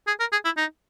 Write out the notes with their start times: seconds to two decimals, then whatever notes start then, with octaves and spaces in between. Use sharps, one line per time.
0.07 G#4
0.20 A#4
0.32 G#4
0.45 E4
0.57 D#4